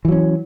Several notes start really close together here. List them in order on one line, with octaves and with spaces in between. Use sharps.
E3 F#3 C#4